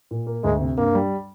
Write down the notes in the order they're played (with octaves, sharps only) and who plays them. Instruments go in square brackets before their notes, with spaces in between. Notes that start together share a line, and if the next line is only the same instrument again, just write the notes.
[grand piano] A#2
A#3
[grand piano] D2 [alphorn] G#3
[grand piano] C3
[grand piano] G2 [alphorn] A#3
[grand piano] G3